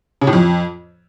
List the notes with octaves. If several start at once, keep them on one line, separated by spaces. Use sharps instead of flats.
C#3
A2
F2